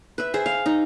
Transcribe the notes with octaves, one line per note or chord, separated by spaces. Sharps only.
B4 E5
G#4 C5 E5
F5
D#4